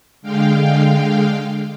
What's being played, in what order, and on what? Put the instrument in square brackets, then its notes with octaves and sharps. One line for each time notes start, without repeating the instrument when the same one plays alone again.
[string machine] D3 G#3 F5 G5